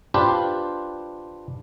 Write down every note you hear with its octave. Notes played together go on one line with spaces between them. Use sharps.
D4 F4 G4 B4 C5